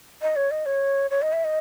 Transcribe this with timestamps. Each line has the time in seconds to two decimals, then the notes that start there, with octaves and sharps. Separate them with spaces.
0.22 D#5
0.36 C#5
0.51 D#5
0.66 C#5
1.11 C#5
1.22 D#5
1.33 E5
1.44 D#5